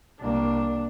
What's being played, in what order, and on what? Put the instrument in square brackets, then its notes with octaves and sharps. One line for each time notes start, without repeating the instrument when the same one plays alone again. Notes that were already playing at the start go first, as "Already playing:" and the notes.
[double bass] C2 A#3 [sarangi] D4